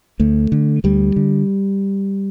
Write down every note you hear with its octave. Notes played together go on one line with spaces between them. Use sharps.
D2 A3
D3
D2 G3
D3